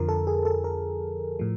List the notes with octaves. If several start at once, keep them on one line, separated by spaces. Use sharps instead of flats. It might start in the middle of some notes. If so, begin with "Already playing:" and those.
Already playing: F2 D3 F3 A#4
A4
G#4
A4
A#4
A2 F3